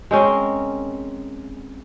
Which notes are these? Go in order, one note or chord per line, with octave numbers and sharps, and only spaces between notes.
G#3 C4 C#4 A#4